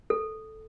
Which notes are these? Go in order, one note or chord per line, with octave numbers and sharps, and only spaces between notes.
A4